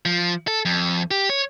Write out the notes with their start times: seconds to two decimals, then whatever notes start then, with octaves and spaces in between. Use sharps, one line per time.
0.05 F3
0.48 A4
0.65 F2
1.11 G4
1.29 C#5